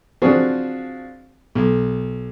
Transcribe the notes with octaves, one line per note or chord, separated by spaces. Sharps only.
F3 C4 D4 F#4 G#4
B1